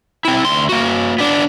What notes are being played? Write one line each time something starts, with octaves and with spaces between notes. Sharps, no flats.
C4 E4
D2 C6
A#3 F#4
B3 D4